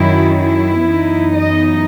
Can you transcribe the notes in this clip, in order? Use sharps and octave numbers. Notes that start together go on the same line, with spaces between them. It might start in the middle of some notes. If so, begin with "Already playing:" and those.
Already playing: F#2 D#3 F#3 E4
E4
F#2 E3 B3 D#4
D#5